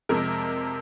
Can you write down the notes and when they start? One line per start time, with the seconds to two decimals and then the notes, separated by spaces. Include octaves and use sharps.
0.09 F2 C3 F3 G#3 A#4